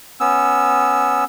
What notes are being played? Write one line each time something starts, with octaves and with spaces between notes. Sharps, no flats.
B3 C#4 E6